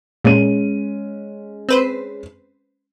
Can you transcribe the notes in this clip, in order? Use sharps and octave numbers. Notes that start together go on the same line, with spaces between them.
A#2 G#3 C#4 D#7
C4 B4 C5